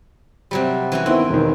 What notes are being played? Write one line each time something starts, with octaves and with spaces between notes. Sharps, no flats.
C3 F#3 G3
E3 C#4 F#4
D#3 B3 C4 E4 G5
E1 D#3